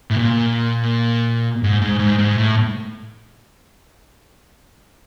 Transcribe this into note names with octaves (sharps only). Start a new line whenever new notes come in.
A2
A#2
G#2
G#2
G#2
G#2
A2